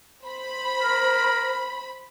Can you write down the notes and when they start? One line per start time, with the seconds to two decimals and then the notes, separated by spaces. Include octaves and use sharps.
0.24 C5 B5
0.82 A#4